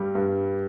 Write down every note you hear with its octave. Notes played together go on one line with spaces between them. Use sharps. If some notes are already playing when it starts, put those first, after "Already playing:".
Already playing: G2 G3
G2